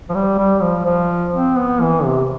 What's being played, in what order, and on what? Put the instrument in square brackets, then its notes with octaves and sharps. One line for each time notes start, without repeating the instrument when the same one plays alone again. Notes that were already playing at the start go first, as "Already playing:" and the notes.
[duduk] F3
G3
G3
F3
F3
C4
B3
E3
C3